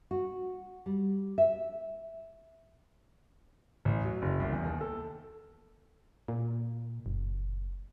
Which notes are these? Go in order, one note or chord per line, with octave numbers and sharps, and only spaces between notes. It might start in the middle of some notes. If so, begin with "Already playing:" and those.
F#4
G3
E5
A1
F#3
F#1
C2
E2
D#2
A4
A#2
F#1